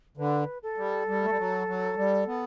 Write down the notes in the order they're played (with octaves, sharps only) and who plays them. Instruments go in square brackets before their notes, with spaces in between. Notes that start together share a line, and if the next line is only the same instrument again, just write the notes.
[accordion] D3 [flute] B4
[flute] A4
[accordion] G3
G3
A3
G3
F#3
F#3
G3
B3